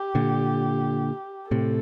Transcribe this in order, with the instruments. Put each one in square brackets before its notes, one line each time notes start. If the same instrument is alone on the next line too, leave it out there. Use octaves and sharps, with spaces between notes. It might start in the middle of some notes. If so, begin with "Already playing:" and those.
Already playing: [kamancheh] G4
[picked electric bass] A#2 D3
[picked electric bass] A2 C3 [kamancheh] A4